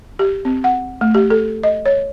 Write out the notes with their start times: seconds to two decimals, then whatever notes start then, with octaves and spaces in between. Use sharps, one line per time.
0.19 G4
0.45 C4
0.64 F#5
1.01 A3
1.15 G4
1.30 A4
1.64 D#5
1.86 C#5